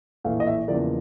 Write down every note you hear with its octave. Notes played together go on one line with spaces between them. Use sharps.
A#1 A2 E3 A3 F5
D#5
E5
E2 C#3 F3 A#3 D5